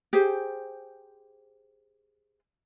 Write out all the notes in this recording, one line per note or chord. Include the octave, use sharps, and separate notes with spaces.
G4 G#4 C5